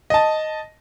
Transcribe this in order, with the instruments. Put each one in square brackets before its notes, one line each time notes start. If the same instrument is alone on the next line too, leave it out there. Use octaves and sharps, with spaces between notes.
[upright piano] D#5 A5